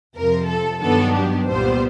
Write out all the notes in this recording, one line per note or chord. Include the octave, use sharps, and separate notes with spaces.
F2 C3 F3 A#4
A4
G2 D#3 F#3 B3 D4 A4
G4
C2 A#2 G3 B3 C5